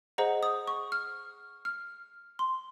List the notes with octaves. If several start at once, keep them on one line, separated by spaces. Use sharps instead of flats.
G#4 C5 D#5 F#5 A#5
D#6
C#6
F6
F6
C6